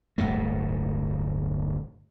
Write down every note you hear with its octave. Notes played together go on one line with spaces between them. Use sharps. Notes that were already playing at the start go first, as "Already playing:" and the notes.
D1 G1 A#2 A3